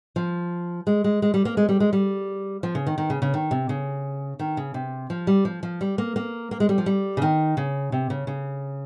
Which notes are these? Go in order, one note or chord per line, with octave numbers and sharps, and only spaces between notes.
F3
G#3
G#3
G#3
G3
A#3
G#3
G3
G#3
G3
F3
C#3
D#3
D#3
C#3
C#3
D#3
C3
C#3
D#3
C#3
C3
F3
G3
F3
F3
G3
A#3
A#3
A#3
G#3
G3
F3
G3
C#3
D#3
C#3
C3
C#3
C#3